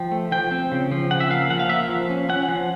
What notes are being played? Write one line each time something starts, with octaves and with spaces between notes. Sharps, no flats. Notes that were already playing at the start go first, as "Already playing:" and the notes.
Already playing: F3 G5
A3
F3 G5
C4
C#3
F3
C#3 F#5
E5
A#3 F5
F3 F#5
F5
A#3 E5
F3
C#4
C#4 F#5
F3